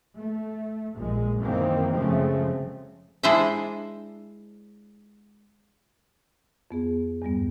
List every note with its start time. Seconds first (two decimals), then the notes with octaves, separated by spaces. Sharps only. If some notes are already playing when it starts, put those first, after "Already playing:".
0.16 A3
0.96 A#1 A#2 G#3
1.40 F#2 D#3 E3 A#3 C4
1.93 F#1 C#3 F3 G#3 A3 C4
3.23 G#3 D4 E4 C5 D#5 E5
6.71 F2 B3 G#4
7.22 E2 G2 G3 B3